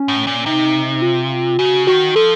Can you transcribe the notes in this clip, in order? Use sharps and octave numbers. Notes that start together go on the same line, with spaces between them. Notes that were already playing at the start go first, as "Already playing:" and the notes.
Already playing: C#4
A2
A#2
C3 D#4
F4
C#3 F#4
D#3 F#4
F3 A4